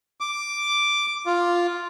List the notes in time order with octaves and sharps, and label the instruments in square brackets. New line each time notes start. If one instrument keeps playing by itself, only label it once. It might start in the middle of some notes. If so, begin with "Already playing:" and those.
[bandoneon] D6
F4